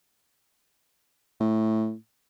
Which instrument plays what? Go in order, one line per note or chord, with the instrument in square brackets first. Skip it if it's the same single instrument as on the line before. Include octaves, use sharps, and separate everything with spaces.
[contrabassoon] A2